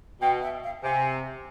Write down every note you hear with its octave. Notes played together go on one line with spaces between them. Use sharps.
B2 G5
E5
F5
C3 G#5